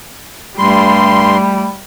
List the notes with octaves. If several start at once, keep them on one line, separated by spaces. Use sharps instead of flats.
G2 G3 A3 B5 C6